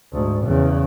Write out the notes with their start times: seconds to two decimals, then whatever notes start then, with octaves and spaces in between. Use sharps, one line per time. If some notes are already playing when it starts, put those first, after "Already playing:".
0.12 D2 G#2
0.45 E2 C#3